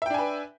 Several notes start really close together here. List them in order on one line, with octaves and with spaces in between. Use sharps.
E5 G5 D4 G#5 B4